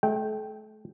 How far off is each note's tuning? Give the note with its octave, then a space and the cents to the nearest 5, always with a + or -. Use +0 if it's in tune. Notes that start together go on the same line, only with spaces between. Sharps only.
A3 -40 G5 +0